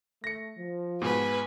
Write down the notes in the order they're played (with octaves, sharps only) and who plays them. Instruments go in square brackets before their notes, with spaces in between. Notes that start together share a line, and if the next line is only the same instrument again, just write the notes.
[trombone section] A3 [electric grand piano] A#6 C#7
[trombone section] F3
[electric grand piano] G#2 B2 [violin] B4 G#5